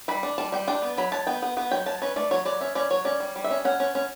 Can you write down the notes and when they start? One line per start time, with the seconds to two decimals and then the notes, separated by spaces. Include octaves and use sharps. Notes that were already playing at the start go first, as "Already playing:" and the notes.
0.08 G3 B5
0.23 D4
0.38 G3 A5
0.52 G3 G5
0.67 D4 G5
0.82 B3
0.97 F#3 B5
1.12 F#3 A5
1.27 B3 G5
1.42 B3 F#5
1.57 B3 F#5
1.71 F#3 G5
1.86 F#3 A5
2.02 C#4 B4
2.16 A3 D5
2.31 F#3 C#5
2.45 F#3 D5
2.61 C#4 E5
2.75 C#4 D5
2.90 F#3 C#5
3.05 C#4 D5
3.20 G3
3.36 G3
3.44 E5
3.50 C#4
3.65 C#4 F#5
3.80 C#4
3.95 C#4